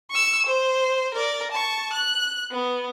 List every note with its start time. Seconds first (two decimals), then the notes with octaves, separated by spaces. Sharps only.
0.11 C#6 E6
0.46 C5
1.14 A#4 D5
1.51 A5 C#6
1.93 F#6
2.51 B3